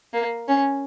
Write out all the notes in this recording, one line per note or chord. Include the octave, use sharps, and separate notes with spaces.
A#3
C#4